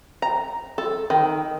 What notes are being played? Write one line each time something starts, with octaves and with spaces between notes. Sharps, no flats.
A#5
A4
D#3